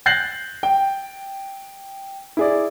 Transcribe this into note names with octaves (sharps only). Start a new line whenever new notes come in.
F#6 G6 A6 A#6 C7 F#7
G5
E4 G#4 D5